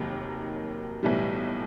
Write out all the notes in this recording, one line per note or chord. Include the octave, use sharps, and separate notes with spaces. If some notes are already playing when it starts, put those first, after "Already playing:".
Already playing: F1 D#2 D#3 F#3 A#3
B1 A2 E3 G3